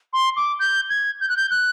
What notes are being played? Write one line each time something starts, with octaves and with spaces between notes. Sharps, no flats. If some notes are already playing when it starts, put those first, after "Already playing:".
C6
D6
G6
G#6
G6
F#6
G6
F#6